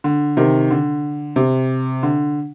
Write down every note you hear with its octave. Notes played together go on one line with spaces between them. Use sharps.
D3
C3 D#3
D3
C3
D3